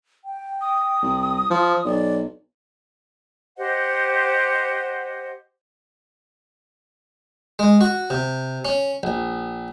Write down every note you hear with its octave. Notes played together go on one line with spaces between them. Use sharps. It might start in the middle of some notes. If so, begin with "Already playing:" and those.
G5
D#6
C2
F3
B1 D5
G4 C5 D#5 F#5
G#3
F#4
C3
C#4
A#1